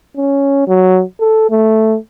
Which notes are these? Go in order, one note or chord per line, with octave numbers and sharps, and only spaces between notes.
C#4
F#3
A4
A3